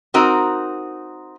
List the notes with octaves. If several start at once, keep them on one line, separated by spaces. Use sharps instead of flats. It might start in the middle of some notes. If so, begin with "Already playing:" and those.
C4 D#4 F#4 A#4